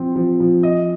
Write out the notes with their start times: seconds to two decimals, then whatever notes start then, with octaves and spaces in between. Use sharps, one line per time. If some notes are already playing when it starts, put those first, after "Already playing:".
Already playing: F3 C4
0.16 F3
0.40 F3
0.63 D#5